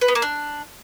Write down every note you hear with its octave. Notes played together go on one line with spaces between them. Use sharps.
B4
B3
A#3
D4